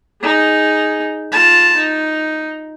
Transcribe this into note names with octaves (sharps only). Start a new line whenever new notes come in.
D#4 G#4
F4 A5
D#4